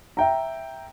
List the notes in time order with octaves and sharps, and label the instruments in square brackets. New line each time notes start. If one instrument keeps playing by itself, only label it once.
[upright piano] E5 G5 A#5